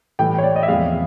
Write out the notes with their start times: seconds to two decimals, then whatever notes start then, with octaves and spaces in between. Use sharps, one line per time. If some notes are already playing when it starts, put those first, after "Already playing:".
0.19 A2 E3 G3 G5
0.38 C#5
0.43 D5
0.56 D#5
0.63 E5
0.68 E2 C3 F3 G#3 F5